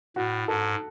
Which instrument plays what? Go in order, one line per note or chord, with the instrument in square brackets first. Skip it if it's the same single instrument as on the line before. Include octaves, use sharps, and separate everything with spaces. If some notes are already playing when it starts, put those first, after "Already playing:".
[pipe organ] A2 [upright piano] F#4
[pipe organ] G#2 [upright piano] A4